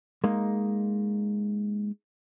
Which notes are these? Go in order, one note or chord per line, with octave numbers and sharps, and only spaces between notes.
G#3 A#3 D#4